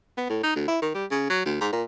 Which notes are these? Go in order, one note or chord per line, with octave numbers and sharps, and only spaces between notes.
B3
A2
D#4
D2
E4
D#3
G3
C#3
F#3
D2
G#2
A#2